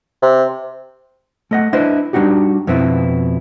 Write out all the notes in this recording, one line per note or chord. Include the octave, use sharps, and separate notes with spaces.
C3
A3 D#5 F#5
D4 E4 B4 C5 D#5
G3 D4 D#4 F#4 G4
F2 B2 B3 C4 E4